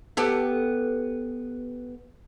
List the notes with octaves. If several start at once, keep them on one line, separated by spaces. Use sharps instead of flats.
B3 G4 A4